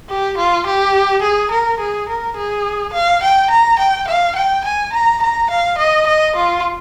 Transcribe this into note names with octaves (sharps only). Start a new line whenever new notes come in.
G4
F4
G4
G#4
A#4
G#4
A#4
G#4
F5
G5
A#5
G5
F5
G5
G#5
A#5
A#5
F5
D#5
D#5
F4